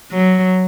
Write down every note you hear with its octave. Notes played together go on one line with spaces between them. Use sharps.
F#3